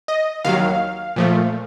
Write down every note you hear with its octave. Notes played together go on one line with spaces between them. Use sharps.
D#5
D#2 D#3 F#3 F5
A#2 F3 A3